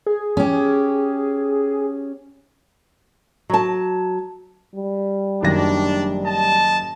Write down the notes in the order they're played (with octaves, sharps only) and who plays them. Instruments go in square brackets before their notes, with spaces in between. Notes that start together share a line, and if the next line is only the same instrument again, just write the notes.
[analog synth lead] G#4
[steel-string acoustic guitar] C#4 G4
[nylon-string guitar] F#3 A5
[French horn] G3
[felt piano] F#1 D#3 A#6 [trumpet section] D4
[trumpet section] D#5 A5